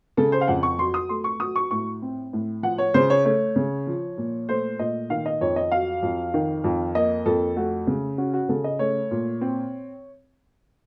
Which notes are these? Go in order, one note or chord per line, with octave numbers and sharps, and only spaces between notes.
C#3 A4
C5
F5
F2 F#5
C#6
F#3 C6
D#6
A3 C6
C#6
F#3 D#6
C#6
A2 C#6
C4
A2
F3 F#5
C#5
C#3 C5
C#5
A3 C#5
C#3
F3
A#2
A3 C5
A#2 D#5
D#3 F5
D#5
F2 C#5
D#5
F#3 F5
F2
D#3
F2
A#3 D#5
F2 A4
A3 F#4
C#3
C#4 F#4
F#4
C#3 A4
D#5
A3 C#5
A#2
C4